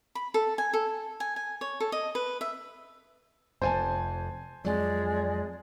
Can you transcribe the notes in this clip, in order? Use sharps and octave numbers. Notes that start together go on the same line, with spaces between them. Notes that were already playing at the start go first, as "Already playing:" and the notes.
B5
A4
G#5
A4
G#5
G#5
C#5
A4
D#5
B4
E5
F1 F2 C5 G#5 A5
F2 F#3 G#3 D5